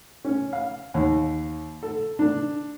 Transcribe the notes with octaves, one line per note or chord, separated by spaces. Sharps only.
C#4
F5
D#2
A4
D4